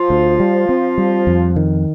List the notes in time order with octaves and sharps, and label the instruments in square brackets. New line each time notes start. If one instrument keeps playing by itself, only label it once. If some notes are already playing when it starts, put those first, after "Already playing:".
Already playing: [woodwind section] F3 F4
[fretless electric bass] D2
G3
C4
G3
F2
D#3